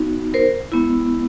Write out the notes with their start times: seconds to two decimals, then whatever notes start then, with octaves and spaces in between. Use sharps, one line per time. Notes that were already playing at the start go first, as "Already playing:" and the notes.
Already playing: B3 D#4 F#4
0.34 A#4 C5
0.72 G#3 B3 E4